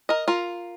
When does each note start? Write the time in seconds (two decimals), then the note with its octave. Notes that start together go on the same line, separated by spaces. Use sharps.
0.09 A#4 D#5
0.28 F4 A#4